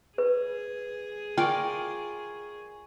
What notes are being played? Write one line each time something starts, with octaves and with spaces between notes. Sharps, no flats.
G#4 B4
F4 A#4 D5 G5 G#5 C#6